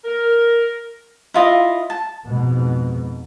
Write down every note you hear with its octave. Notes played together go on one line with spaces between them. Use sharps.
A#4
E4 F4 D#5
A5
F2 G#2 B2